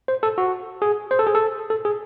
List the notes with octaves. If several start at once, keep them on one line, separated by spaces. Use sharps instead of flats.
C5
A4
F#4
G#4
C5
A4
G#4
A4
A4
G#4